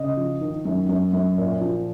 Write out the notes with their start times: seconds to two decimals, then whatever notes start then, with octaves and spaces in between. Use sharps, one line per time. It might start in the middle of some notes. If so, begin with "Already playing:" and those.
Already playing: C#3 D#5
0.17 F3
0.41 D#3
0.65 F#2
0.89 F#2
1.13 F#2
1.38 A#2
1.61 F3